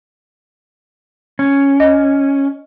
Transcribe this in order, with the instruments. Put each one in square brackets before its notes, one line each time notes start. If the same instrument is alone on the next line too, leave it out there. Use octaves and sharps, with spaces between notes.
[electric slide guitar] C#4
[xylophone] D#5